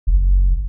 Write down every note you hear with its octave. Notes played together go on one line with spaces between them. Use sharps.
F#1